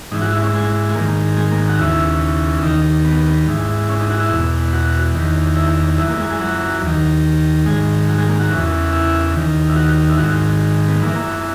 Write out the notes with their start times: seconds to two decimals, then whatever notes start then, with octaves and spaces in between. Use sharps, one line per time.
0.11 G#2 E3 D#4
0.22 F#4
0.33 E4
0.42 C#4
0.54 G#3
0.89 G#3
0.95 G#2 D#3 A#3
1.37 G#3
1.51 A#3
1.69 F#4
1.79 D#2 C#3 E3 E4
2.62 D#2 D#3 D#4
3.05 B3
3.46 G#2 E3
3.89 C#4
4.00 D#4
4.10 F#4
4.20 E4
4.30 E2 B2
4.73 F#4
5.15 E2 D#3
5.56 E4
5.98 F#2 E3 E4
6.09 A#3
6.19 G#3
6.31 G#3
6.40 F#3
6.82 D#2
6.87 D#3
7.66 G#2 D#3 G#3
8.09 F#3
8.19 G#3
8.29 A#3
8.40 F#4
8.50 E2 C#3 E3
8.93 E4
9.34 D#2 D#3
9.70 E4
9.76 F#4
10.09 E4
10.18 G#2 D#3 F#4
10.88 B3
11.02 F#2 E3 A#3